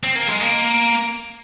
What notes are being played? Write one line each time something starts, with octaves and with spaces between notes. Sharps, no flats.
C4
A#3
G#3
A#3